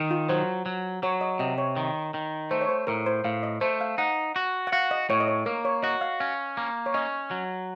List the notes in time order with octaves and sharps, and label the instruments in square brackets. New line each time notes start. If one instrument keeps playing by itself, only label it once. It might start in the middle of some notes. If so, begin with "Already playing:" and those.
Already playing: [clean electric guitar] D#3
[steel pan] F4
[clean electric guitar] F#3 [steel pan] C5
[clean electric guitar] F#3
[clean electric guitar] F#3 [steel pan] C#5
[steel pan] D#5
[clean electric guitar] C3 [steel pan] D#5
[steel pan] C#5
[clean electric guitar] D#3
D#3
[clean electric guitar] A3 [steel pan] C5
[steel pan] C#5
C5
[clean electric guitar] A2 [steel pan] A#4
[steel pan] C5
[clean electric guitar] A2 [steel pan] F5
[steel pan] D#5
[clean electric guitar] A3 [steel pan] C5
[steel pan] F5
[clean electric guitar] D#4 [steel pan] F#5
[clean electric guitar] F#4
[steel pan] F#5
[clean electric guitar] F#4 [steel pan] F5
[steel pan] D#5
[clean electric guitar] A2 [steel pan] C#5
[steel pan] D#5
C#5
[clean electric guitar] A#3 [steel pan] A#4
[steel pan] C#5
[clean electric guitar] F#4 [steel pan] D#5
[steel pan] F5
[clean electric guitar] C#4 [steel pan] F5
[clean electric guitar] A#3
[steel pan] C#5
[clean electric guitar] C#4 [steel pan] D#5
[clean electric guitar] F#3